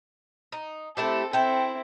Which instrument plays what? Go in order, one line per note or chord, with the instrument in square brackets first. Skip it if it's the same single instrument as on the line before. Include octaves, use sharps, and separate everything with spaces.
[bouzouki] D#4
[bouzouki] A3 E4 G4 [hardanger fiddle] C4 A4
[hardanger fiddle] C4 E4 [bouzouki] A4 G5